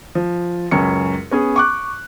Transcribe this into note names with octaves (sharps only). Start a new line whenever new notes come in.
F3
C#2 F#2 C#4 C#7
B3 C#4 G#4
C#6 D6 F#6